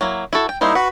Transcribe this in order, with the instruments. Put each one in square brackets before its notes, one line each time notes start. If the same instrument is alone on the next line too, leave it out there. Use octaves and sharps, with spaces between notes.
[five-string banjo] F#3 A#3 E4
E4 F#4 A4
G5
[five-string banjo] G3 A#3 C5 [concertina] D#4 E4
[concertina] F#4 B4 B5 [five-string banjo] F#5